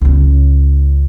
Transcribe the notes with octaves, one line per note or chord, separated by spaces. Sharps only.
C#2 C#3